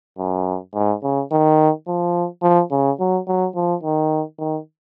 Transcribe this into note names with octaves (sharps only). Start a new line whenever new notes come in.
F#2
G#2
C#3
D#3
F3
F3
C#3
F#3
F#3
F3
D#3
D#3